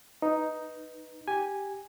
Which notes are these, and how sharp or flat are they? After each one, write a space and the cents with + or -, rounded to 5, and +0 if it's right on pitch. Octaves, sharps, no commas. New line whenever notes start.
D#4 +0 B4 +0
G4 +0 G#5 -5